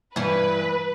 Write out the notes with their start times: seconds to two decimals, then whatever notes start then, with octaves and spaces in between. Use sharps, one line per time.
0.16 G2 E3 B4